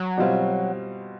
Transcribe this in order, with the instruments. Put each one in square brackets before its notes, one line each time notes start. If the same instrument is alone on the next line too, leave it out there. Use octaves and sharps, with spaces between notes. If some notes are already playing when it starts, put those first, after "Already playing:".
Already playing: [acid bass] F#3
[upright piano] B2 G3 C4 F4